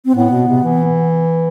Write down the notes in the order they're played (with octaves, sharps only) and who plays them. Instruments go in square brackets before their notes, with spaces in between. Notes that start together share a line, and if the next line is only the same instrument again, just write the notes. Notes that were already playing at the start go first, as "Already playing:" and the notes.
[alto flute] C4
[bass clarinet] A2 [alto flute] B3
[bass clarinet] B2
C3
E3